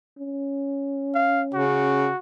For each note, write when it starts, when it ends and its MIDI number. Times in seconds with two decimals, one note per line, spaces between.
0.18 1.86 61
1.15 1.43 77
1.54 2.09 49
1.54 2.18 66